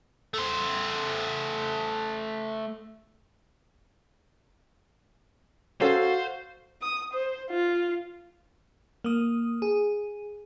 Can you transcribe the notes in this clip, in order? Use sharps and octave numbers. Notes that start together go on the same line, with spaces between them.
A3 C5
C#4 F#4 A4 C5 F5
D#6
C5
F4
A#3 D#6
G#4